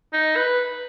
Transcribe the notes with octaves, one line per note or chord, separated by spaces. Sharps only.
D#4
B4